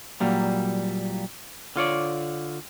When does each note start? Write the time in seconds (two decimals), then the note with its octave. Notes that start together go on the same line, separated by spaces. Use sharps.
0.20 A#2 F#3 G3 A#3
1.76 D3 F4 C#5 D5